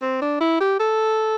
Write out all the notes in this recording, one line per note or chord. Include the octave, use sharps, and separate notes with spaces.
C4
D4
E4
G4
A4